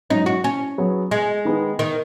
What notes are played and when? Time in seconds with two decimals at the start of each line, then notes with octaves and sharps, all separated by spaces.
0.10 G#2 F#3 C#4 D#4
0.26 F#4
0.44 C#4
0.78 F#3 B3 G#4
1.11 G#3
1.45 D#3 B3 D#4 G#4
1.79 D#3